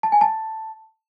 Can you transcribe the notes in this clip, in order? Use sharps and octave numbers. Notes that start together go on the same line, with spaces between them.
A5
G#5
A5